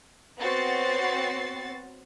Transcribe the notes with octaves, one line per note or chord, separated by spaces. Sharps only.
B3 C4 F#4 C#5 A6 C7